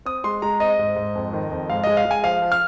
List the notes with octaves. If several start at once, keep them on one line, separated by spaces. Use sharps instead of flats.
C4 D#6
G#3 C6
G#3 A#5
C4 D#5
G#2
G#2
F2
D#3
F2
G#2 F5
G#3 D#5
F5
G#3
G#5
F3 F5
F3
F6